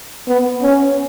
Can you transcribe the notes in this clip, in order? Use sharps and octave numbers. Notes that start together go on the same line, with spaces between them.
B3
C#4